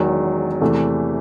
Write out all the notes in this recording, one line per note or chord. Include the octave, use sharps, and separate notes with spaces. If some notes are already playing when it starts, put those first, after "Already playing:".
Already playing: E1 E2 D#3 F#3
E2 C3 E3 A3